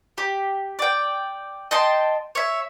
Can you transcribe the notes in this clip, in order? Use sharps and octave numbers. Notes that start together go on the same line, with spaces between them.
G4
D5 G5
D#5 G5 A5 C6
C#5 E5